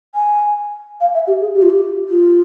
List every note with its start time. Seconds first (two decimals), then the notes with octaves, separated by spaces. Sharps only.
0.15 G#5
1.01 F5
1.14 E5
1.27 G4
1.41 G#4
1.54 G4
1.62 F4
1.70 G4
2.08 F4